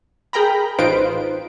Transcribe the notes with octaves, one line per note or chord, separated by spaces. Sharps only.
G#4 A#4 G5 A#5 B5
A1 D#4 F4 B4 C5 D7